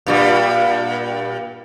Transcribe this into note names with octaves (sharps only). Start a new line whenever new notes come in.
G2 A#2 G3